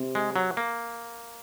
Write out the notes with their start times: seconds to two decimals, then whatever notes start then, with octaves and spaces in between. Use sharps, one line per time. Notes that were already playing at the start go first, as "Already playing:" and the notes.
Already playing: C3
0.15 G#3
0.36 F#3
0.57 A#3